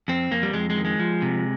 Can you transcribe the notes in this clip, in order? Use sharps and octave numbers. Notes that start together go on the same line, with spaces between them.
F2 C4
F2 A#3
G3
F2 G#3
G#3
D#3
G#3
F3
C3